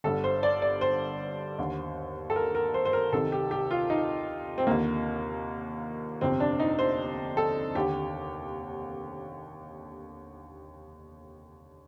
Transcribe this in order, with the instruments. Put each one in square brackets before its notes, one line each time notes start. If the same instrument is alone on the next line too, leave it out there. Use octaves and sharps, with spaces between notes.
[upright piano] G1 G2 D3 A4
C5
D5
D5
C5
D#2 D3
A4
A#4
A#4
C5
C5
A#4
C2 C3 D#3 A4
G4
G4
F4
D#4
C4
D#2 D3 A#3
G1 F2 C3 C4
D4
D#4
C5
A4
D#2 D3 G4